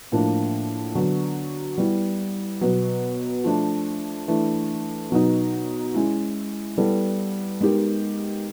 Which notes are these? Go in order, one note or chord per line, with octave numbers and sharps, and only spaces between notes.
A2 F3 A#3 D4
D3 F#3 B3
G3 B3 E4
B2 F#3 B3
F3 A3 D4
E3 A3 D4
B2 F#3 B3 D#4
G#3 C#4 E4
G3 B3 E4 A4
G#3 B3 D#4 G4 A#4